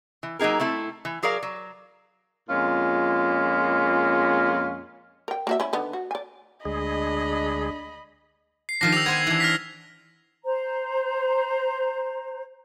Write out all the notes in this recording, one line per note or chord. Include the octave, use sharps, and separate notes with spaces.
E3
F#3 A#3 D#4 G#4 A#4
A3 C4 E4 A4
E3
F#3 G#4 A#4 D5 F5
F#3
F2 A#2 G#3 C#4 F4
A#4 G5
A#3 F#4 E5
C#4 E4
D3 D#3 B3
F#4
D5 G#5
D2 G#3 D4 G#4 D#5 B5
C7
D#3 F3 D4 A#6 C7
G4 E6 F7
B3 C5 G#5 G#6
E3 D4
F6 A#6 B6
C5 A#5